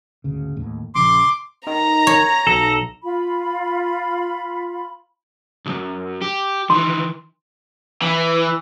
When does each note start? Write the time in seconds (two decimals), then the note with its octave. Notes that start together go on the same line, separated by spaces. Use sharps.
0.24 G#1 D2 C#3
0.56 D#2 A2
0.95 A#1 C#3 F3 C6 D6
1.67 D#3 A#5 A#6
2.07 C#5
2.47 B1 A4
3.03 F4 B5
5.65 B1 F#2
6.22 G4
6.70 D#3 E3 C6
8.02 E3